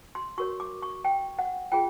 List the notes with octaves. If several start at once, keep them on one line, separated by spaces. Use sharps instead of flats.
C6
F#4 A#4 C#5 C#6
D6
C#6
G5
F#5
F4 G#4 G5